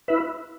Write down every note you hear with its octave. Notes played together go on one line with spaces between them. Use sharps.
E4 B4 E5